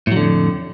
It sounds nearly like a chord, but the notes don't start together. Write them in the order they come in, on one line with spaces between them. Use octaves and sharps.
A2 F#3 D3 F2